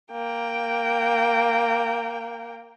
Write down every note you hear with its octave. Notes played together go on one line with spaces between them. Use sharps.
A#3 G5